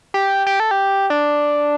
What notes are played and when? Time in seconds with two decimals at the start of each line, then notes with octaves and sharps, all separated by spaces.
0.14 G4
0.47 G4
0.60 A4
0.71 G4
1.10 D4